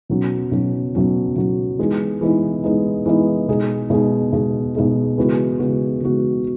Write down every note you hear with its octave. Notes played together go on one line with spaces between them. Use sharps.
B2 F#3 C#4
B2 F#3 C#4
B2 F#3 C#4
B2 F#3 C#4
E3 G#3 B3 D#4
E3 G#3 B3 D#4
E3 G#3 B3 D#4
E3 G#3 B3 D#4
B2 G#3 D#4 G#4
B2 G#3 D#4 G#4
B2 G#3 D#4 G#4
B2 G#3 D#4 G#4
C#3 E3 G#3 B3 F#4
C#3 E3 G#3 B3 F#4
C#3 E3 G#3 B3 F#4